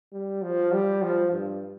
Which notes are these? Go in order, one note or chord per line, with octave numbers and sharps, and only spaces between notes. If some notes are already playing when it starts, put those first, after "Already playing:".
G3
F3
G3
F3
G2